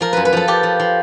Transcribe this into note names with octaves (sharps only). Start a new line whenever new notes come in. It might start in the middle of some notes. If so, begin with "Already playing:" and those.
F3 A#4
F#2 B4
B4
F3 A4
F3 G4
F3
F3